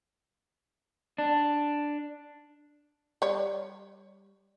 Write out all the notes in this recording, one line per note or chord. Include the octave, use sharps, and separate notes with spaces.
D4
G3 C#5